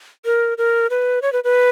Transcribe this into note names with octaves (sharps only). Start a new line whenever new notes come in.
A#4
A#4
B4
C#5
B4
B4